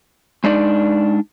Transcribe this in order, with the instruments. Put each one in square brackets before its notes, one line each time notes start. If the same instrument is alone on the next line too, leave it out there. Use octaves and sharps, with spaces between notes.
[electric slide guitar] G#3 D4 D#4 D5